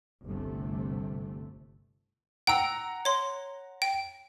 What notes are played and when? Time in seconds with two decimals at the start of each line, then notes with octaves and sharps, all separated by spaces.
0.25 G1 C2 C3 A3
2.47 F#5 G5 A#5 E6
3.05 C#5 C6
3.82 G5